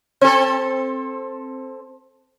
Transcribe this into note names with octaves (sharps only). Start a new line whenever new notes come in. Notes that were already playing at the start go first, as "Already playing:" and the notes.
C4 A4